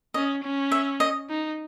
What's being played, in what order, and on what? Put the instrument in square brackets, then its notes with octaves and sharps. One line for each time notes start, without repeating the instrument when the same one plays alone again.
[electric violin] C#4 [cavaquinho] D#5
[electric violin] C#4
[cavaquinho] E5
D#5
[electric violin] D#4